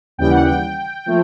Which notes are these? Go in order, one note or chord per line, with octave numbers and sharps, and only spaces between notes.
D#2 C#3 E3 G3 G5
F#5
G5
F3 A3